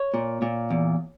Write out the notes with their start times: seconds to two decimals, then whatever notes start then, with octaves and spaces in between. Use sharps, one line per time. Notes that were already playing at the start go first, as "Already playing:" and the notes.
Already playing: C#5
0.14 A#2
0.42 A#2
0.70 E2